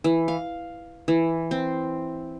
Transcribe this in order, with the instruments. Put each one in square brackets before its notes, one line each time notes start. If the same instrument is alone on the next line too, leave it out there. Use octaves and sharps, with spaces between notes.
[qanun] E3
F5
E3
C4